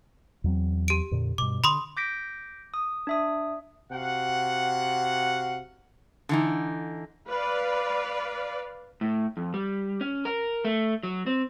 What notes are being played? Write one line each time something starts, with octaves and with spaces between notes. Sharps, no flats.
E2 F#3 C4
G4 D7
F2 A#2 D3
G2 B2 D6
D3 B5 C6 D#6
D6 G6 A#6 B6 D7
D#6
D4 E5 D#6
C3 F#4 F5 F#5
D3 E3 D#4
B4 D5 F5
A2
F2
G3
C#4
A#4
A3
F#3
C4